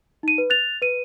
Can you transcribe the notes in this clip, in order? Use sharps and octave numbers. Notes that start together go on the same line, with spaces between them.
D#4 D#7
B4
F#6 A6 F7
B4 D#7